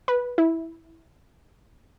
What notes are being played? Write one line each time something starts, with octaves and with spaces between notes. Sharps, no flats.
B4
E4